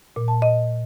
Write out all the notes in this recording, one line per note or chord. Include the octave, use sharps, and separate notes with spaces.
A#2
A5
D#5